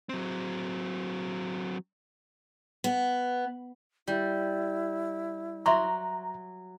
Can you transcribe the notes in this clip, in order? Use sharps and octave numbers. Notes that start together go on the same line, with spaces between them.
F#3 C4
B3
G3 E4
F#3 E5 A#5 C6 C#6